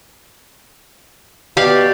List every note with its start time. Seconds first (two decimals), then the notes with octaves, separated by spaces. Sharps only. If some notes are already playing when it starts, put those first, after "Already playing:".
1.57 B2 G4 D5 F5